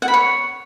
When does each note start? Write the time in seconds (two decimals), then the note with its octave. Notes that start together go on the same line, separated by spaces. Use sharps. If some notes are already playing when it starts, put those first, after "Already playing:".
0.02 F#5
0.08 B5
0.14 C#5